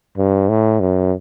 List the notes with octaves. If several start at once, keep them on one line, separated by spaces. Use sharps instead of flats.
G2
A2
F#2